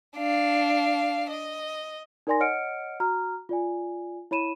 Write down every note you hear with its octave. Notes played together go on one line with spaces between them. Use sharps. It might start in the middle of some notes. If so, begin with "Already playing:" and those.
D4 F5
D#5
D#4 A#4 D5 G#5 C6 A#6
C#5 D#5 F#5 F6 C#7 D7
F#4 A#5 F6
F4 D5 G#5
E4 C#5 B5 D#7 E7